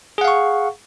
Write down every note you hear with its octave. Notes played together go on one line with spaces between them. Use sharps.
G#4 F5 F#5 C#6